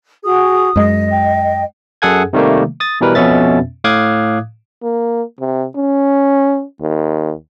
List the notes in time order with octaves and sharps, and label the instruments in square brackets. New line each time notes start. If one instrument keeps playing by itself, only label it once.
[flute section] F#4 G#4 [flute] D#6
[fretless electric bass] F#2 G#3 [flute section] D#5
[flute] G5
[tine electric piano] F#2 G#4 A4 F#5 G#5 G#6
C3 D#3 G3 A3 A#3
D#6 A6
B2 E3 G3 A#4 B4
F2 B2 B3 C#4 E5 A6
A2 F5 D6 D#6 F#6 G#6
[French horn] A#3
C3
C#4
D#2